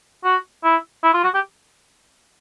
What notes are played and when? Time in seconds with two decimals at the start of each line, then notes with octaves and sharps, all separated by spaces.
0.24 F#4
0.64 E4
1.03 E4
1.14 F4
1.23 F#4
1.34 G4